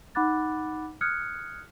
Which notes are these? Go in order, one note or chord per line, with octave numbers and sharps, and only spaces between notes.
D#4 F#5 B5 D6 F#6 A6
D#6 F6 F#6 G#6 C#7